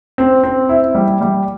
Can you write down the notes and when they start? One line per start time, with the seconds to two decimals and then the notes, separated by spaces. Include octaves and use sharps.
0.18 C4
0.43 C4
0.69 E4
0.95 G3
1.21 G3